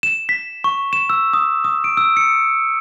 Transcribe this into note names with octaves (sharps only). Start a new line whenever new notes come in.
E7
B6
C#6
E7
E6
D#6
D#6
D7
E6
C#7